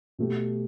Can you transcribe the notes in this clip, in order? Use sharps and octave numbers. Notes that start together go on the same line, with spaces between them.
B2 A3 G4